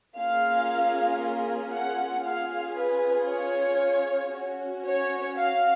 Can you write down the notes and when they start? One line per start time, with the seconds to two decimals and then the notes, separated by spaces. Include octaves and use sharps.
0.15 A#3 C#4 F4 G#4 F5
1.72 F#5
2.24 C#4 F4 G#4 F5
2.77 B4
3.29 C#5
4.34 C#4 F#4
4.86 C#5
5.39 F5